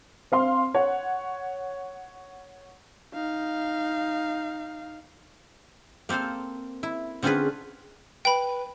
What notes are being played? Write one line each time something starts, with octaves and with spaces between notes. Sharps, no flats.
C4 F5 C6
C#5 F#5
D#4 F5
A#3 C4 A4 C5 F5
E4
D3 C4 C#4 F4 G#4 B4
B4 G5 B5